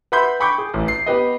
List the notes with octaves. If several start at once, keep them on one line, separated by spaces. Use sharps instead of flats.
B4 E5 F#5 B5 C6 G6
G5 B5 C#6 D6 G6
G#4
A1
C7
B3 G4 B4 D#5